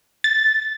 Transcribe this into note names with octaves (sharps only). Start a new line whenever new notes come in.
A6